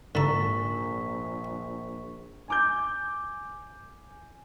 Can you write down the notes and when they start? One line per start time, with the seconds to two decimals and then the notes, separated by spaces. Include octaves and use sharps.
0.15 A#1 G#2 D3 A4 A#5 C#6 B6
2.48 G#5 D6 G6